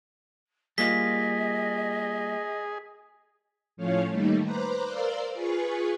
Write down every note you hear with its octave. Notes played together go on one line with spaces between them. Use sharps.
G3 A#3 F4 G#4 D#5 B6
A2 F3 A3 C#4 C#5 F5
D#3 G3 A3 A#3 D#4
B4 C5 A#5 D6 F#6
A#4 C5 D5 F5 C6 E6
F4 G#4 B4 G#5 C#6